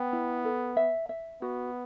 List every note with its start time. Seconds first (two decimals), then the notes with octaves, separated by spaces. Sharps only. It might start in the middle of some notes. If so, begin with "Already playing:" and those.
Already playing: B3 G5
0.13 E4
0.45 A4
0.77 E5
1.09 E5
1.42 B3 F#4